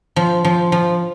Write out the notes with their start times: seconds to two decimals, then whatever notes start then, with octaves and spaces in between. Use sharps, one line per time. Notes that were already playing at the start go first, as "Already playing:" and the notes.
0.16 F3
0.45 F3
0.72 F3